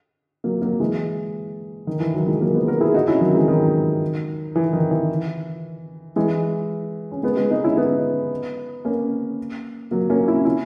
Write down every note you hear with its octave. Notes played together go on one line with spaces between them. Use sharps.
F#3 A#3
F#3 A#3
E3 G#3
D#3
E3
D#3 F#3
E3 G#3
F#3 A#3
G#3 B3
F#4 A#4
E4 G#4
D#4 F#4
C#4 E4
D#3 F#3
E3 G#3
D#3 F#3
E3
D#3
E3
E3 G#3
C#4
G#3 B3
G#3 B3
B3 D#4
C#4 E4
B3 D#4
A#3 C#4
F#3 A#3
A#3 C#4
C#4 E4
C#4 E4